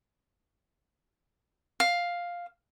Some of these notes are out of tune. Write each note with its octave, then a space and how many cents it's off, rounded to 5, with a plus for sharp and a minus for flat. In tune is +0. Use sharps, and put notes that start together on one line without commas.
F5 +5